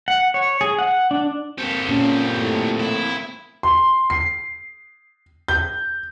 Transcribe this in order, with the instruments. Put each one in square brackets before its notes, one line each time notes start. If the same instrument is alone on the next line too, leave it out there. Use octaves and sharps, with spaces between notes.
[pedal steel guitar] F#5
C#5
G#4
F#5
D4
[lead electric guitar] A#3 C4 [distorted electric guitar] G4 A4
[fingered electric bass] A#2 [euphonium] C#4
[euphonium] A2
[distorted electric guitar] E4
[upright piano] C6
C7
G6